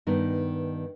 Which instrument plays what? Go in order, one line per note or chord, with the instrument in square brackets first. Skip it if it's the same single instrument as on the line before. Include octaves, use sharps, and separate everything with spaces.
[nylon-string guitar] G2 D#3 B3 D#4